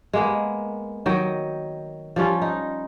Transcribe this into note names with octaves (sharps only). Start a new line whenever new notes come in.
G#3 A#3 B3
D#3 F#3 D#5 G5
F3 G3 C#4 F4
D#4